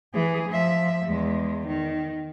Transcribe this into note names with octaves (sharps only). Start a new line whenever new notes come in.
E3 G#4
F3 E5
E2 G#3
D#3